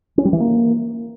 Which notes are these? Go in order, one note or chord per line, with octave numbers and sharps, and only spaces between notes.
C#4
G3
E3
A#3